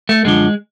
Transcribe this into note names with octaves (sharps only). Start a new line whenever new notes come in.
A3
F#2 D3 F3 G#3